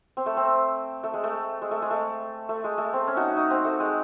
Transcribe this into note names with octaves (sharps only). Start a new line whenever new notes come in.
C4
A3
C4
A3
G#3
A3
G#3
A3
G#3
A3
A3
G#3
A3
C4
C#4
D#4 F#4
D#4
C4
A3
G#3